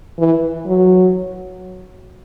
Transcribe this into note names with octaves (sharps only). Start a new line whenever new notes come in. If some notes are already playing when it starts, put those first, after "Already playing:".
E3
F#3